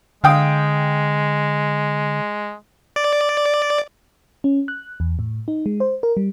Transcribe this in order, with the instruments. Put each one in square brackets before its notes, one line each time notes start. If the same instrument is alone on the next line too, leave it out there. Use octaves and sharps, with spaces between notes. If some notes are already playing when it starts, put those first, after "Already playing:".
[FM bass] D3 [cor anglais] G#3 [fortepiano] F5 G5 D#6
[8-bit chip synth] D5
[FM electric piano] C#4
F#6
E2
A2
D#4
G#3
C5
A#4
G3